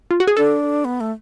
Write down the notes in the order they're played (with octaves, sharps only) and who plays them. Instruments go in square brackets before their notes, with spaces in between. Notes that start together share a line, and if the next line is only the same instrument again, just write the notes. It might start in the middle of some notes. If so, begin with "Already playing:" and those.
[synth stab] F4
F#4
G#4
[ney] D4 [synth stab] A4
[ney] B3
A3